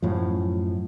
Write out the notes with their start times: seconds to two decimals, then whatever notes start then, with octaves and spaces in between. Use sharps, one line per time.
0.02 F#2 A2 F3